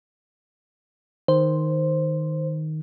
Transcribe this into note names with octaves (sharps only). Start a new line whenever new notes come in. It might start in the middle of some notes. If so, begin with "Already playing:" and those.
D#3 C5